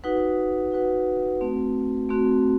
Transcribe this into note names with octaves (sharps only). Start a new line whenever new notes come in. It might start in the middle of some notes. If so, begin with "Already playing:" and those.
D#4 F#4 B4 F#5
D#4 F#4 B4 F#5
A3 C4 F#4
A3 C4 F#4